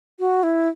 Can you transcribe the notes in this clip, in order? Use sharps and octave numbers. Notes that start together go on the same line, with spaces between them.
F#4
E4